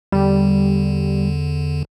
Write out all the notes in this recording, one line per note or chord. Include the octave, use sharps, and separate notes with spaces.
E2 D3 G3